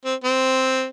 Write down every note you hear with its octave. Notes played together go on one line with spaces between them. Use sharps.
C4
C4